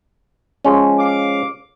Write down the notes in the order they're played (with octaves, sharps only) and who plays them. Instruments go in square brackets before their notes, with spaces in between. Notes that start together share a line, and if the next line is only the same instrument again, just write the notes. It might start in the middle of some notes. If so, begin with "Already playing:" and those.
[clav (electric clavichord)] F3 G#3 C#4
[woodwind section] F5 D6